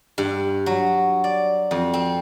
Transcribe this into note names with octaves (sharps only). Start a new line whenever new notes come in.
G2
F#3
D5
F2
C4